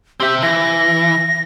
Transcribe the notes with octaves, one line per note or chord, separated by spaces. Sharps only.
C4 G4 E5
E3 A#6